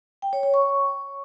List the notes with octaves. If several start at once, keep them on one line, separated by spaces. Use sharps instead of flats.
G5
C#5
C#5
C#6